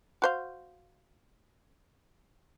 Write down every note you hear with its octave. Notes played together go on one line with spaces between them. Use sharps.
F#4 C5 F5